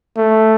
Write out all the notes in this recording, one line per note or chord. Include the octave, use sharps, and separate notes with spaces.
A3